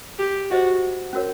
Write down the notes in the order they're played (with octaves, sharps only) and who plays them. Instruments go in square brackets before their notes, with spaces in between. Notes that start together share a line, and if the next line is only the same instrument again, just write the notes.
[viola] G4
[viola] F#4 [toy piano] C5 D#5 F#5
[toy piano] C#4 F#4 A#4 C#5